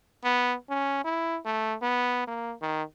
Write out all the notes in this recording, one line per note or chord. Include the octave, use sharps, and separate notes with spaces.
B3
C#4
E4
A3
B3
A#3
D#3